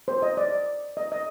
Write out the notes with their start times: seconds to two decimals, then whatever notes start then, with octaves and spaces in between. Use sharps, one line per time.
0.08 C5
0.22 D#5
0.37 D5
0.97 D#5
1.12 D#5